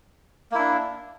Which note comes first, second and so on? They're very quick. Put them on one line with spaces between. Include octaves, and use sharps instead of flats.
A#3 E4 D4